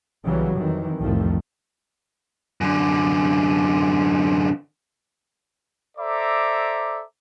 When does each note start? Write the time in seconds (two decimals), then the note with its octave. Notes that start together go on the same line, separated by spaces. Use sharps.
0.26 B1 C#3 E3 F#3 G3
0.58 F2 D#3 E3
1.01 C2 F2 A2 D#3 F3 A3
2.61 F#2 D3
5.98 A4 C5 D5 E5 A#5 D6